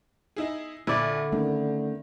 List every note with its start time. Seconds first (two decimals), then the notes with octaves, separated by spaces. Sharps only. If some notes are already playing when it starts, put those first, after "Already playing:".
0.36 D#4 E4 G#4
0.87 A#1 D3 E4 D5
1.32 D#3 A3 C4 C#4